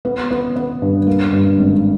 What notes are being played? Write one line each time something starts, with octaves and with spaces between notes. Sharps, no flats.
B3
B3
B3
G2
A#3
G2
G#1